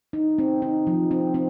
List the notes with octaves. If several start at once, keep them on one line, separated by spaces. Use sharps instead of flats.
D#4
C4
D#4
F3
C4
C4